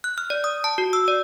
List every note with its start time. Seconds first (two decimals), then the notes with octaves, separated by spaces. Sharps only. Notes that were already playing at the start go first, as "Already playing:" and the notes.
0.04 F#6
0.18 F6
0.30 D5
0.44 D#6
0.64 A5
0.78 F#4
0.93 E6
1.08 D5